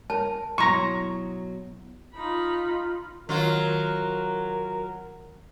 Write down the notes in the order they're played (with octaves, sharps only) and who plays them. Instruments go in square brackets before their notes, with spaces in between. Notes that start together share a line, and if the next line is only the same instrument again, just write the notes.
[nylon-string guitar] A#4 [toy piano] A5
[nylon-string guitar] B2 F#3 E4 [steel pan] A#5 C#6 [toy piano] C6
[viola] D#4 B5 [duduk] F4
[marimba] D#3 [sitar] F#3 F4 [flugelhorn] A#4